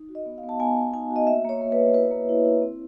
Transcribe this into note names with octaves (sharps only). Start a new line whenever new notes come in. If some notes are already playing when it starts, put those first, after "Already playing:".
Already playing: D#4
F#4
D#5
B3
F5
B3
A5
B3 G#5
B3
D#4 G#5
F#4
D#5
A#3 E5
A#3 C#5
A#3
B4
A#3
E4 B4
A#3
E4
E4
C4